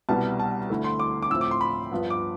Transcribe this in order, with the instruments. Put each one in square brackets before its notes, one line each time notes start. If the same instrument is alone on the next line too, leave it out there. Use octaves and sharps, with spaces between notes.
[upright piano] C2 B2 G3 B3 [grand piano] A5
[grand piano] A5
[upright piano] D2 D3 A3 E4
[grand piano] C6
D6
D6
[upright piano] A2 F3 C4 [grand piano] E6
[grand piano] D6
C6
B5
[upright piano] G2 F3 B3
[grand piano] D6